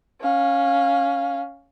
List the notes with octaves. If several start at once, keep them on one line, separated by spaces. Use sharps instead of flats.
C#4 F5